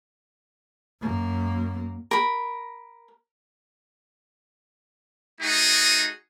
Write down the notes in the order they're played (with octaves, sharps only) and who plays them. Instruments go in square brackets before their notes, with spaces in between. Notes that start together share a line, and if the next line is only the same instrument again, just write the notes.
[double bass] F#2 A#3
[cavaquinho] A#4 B5
[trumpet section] A3 D#4 F#4 G#4